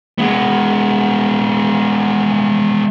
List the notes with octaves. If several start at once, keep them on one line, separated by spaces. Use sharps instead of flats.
G#3 B3